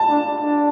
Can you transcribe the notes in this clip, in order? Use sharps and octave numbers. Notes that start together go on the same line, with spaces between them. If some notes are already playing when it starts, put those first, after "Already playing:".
Already playing: A5
D4
D4